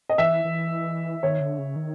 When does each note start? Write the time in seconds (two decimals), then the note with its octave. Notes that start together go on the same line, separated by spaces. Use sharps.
0.09 D#5
0.18 E3 E5
0.45 E3
1.23 D#3 C#5
1.40 D3
1.58 C#3
1.76 D#3